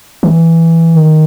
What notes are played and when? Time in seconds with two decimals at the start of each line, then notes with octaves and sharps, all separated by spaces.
0.23 E3
0.95 D#3